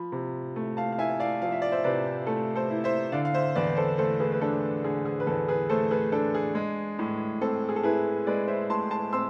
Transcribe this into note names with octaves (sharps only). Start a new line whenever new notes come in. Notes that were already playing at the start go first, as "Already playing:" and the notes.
Already playing: F3 B5
C3
A3
F5 A5
F5
E4 E5 G#5
D5 F5
F3 F5
E5
D5
C5 E5
C3 B4 D5
A3 A4
A4 C5
E4
C5 E5
D3 D5 F5
F5
C5 E5
E2 B4 D5
A4 C5
A3 A4 C5
G#4 B4
B4
D4 A4
D3 G#4
G#4
B4
E2 A4
G#4 B4
A3 A4 C5
G#4 B4
D4 A4
G#4
G#3
A2
C4 A4
G#4
A4
E4 G#4 B4
G#3 B4 D5
C5 E5
A2 A5 C6
A5 C6
C4 C6 E6